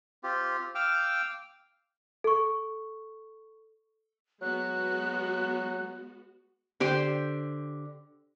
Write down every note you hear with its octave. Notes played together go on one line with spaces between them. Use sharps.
C4 F4 G4
F5 G5 D6 E6 F6
A4 C#6
F#3 G#3 B3 F#4 F#6
D3 G4 C5 G5